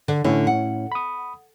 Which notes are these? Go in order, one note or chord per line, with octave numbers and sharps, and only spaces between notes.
D3
A2 D3 C#4 E4
F#5
B5 D#6